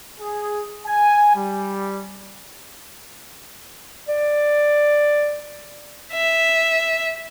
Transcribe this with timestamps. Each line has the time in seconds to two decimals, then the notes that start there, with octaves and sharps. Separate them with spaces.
0.21 G#4
0.87 G#5
1.36 G3
4.08 D5
6.14 E5